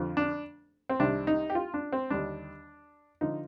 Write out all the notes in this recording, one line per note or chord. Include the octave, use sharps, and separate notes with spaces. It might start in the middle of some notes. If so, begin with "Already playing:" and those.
Already playing: F2 D3 F3
D4
C4
C2 C3 D#3 D4
D#4
G4
F4
D4
C4
D#2 D3 G3 D4
D3 F3 D#4